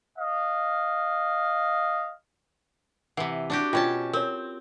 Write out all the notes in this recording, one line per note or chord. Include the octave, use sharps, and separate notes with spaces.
D#5 F5
C3 E3 F#5
D4 F#4 G4
B2 C#4 F4 G5 A5 B5
C4 A#4 C#5